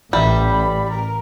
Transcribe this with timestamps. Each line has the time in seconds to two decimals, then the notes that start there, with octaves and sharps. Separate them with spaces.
0.13 A1 G3 E5
0.49 B5
0.90 A#4